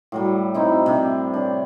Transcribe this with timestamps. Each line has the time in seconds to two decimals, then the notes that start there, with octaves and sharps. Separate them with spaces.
0.12 A2 F#3 G3
0.54 C4 D#4 E4
0.86 C3 D4
1.34 D4 C#5